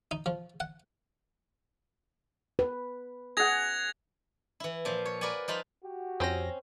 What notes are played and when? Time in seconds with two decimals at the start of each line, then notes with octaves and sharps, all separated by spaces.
0.11 D#4
0.26 F3
0.60 F#5
2.59 B4
3.37 G#4 F#5 G#6 A#6 F7
4.60 E3 E4
4.85 A#2 F3
5.06 C#5
5.21 A#4 B4 D5 F#5 G#5
5.48 F3 D#4 F4 B5
5.83 F#4 G4
6.20 F2 C4 C#4 C5 A#6